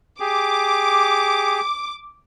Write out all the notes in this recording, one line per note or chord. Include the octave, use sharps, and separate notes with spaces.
G4 G#4 D6